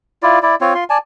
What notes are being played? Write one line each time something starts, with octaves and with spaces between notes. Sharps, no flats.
E4 F4 D5
E4 D5
C4 F4 C#5
F4 C6
D5 G#5 A5